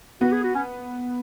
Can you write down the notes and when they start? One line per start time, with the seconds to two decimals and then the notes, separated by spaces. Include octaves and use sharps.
0.21 B3 F#4
0.32 G#4
0.43 F#4
0.55 C#4